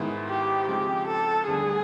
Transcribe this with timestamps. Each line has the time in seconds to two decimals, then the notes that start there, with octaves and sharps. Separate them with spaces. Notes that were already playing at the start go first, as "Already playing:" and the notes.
Already playing: G#2 D#3 G#3 B3 E4
0.29 G4
0.67 C#3 F3 G#3 C4 D#4 G4
1.08 A4
1.48 D2 D3 G3 B3 D4 G#4